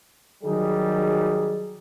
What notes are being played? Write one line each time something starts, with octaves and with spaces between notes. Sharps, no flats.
D#3 F#3 G3 D#4 G#4